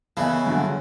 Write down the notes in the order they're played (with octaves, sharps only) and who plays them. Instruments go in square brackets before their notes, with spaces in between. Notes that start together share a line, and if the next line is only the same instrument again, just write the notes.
[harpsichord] C#3 E3 [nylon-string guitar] B3 D#5 A5
[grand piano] G2 D3 F#3